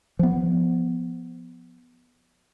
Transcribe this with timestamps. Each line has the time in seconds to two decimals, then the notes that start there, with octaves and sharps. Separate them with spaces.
0.19 F3 B3